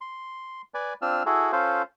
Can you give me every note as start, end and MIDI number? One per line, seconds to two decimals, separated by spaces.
0.01 0.62 84
0.74 0.93 71
0.74 0.93 74
0.74 0.93 80
1.02 1.23 60
1.02 1.23 62
1.02 1.23 65
1.02 1.23 88
1.02 1.23 89
1.26 1.52 64
1.26 1.52 66
1.26 1.52 68
1.26 1.52 69
1.52 1.82 61
1.52 1.82 65
1.52 1.82 69
1.52 1.82 72
1.52 1.82 77